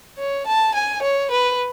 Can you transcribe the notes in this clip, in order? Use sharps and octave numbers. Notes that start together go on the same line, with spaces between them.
C#5
A5
G#5
C#5
B4